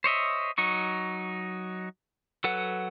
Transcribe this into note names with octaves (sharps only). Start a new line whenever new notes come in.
C5 C#5 D#5 E5
F#3 D#4 C#6
F#3 A4 B4 F#5